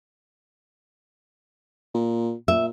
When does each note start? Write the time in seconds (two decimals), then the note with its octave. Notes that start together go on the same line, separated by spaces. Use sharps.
1.94 A#2
2.48 A#2 E5